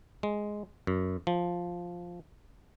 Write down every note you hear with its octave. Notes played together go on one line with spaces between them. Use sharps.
G#3
F#2
F3